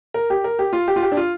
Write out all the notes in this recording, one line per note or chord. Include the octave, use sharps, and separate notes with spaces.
A#4
G4
A#4
G4
F4
G4
F4
G4
D4
F4